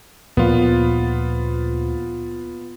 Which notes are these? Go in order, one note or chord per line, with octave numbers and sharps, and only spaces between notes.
D2 A#2 F3 A#3 B3 F4